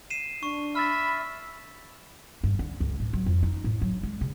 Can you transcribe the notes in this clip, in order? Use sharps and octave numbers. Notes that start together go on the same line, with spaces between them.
C7 D#7 E7
D4 C#6
E5 B5 F6 A6
G2
D3
C#2
A2
F#3
F2
D#4
A2
F#3
G#3
C#3